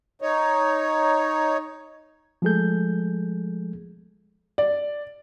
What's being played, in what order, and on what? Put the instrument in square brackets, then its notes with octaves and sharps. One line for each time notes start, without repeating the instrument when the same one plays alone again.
[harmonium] D#4 C#5
[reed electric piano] F3 G#3 A3 G#4 A4 G6
[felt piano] D5